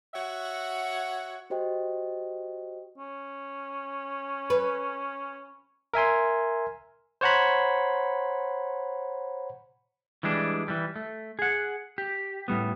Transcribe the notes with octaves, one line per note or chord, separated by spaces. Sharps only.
F#4 C#5 E5 F#5
F#4 G4 C5 D#5 G5
C#4
B4
A#4 E5 G#5 C6
C5 C#5 F#5 A#5 B5
E3 G3 G#3 D4
E3 G3
A3
G#4 F#5
G4
A2 G3 B3